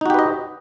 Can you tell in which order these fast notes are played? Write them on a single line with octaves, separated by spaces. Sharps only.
D#4 F#4 G4 B4 D#5